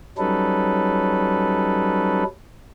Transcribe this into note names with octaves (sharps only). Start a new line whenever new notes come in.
F#3 G3 C#4 D#4 A4 B4